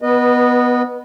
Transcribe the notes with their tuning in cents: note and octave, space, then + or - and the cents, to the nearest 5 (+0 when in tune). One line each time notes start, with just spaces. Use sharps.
B3 +0 B4 -25 D#5 -20